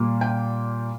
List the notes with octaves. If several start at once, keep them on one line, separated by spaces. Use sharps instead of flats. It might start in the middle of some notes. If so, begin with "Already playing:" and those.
Already playing: A#2 G3 A#3
G5